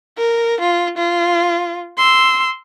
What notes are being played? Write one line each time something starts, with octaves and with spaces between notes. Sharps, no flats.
A#4
F4
F4
C6 E6